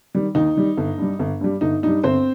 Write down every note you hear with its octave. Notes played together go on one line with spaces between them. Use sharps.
D#3 G3
D#2 D#4
D#3 G3
G1
G2 G3
G1
G2 G3
G1 D#4
G2 G3 D#4
G1 C4 C5